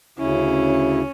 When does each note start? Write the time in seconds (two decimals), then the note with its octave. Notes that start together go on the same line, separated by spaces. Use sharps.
0.19 D2 C#3 C#4 E4